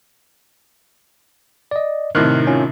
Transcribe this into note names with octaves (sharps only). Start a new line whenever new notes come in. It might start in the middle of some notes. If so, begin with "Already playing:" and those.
D5 D#5
A2 C3 D#3 D#4 F6 F#6
C#4 F4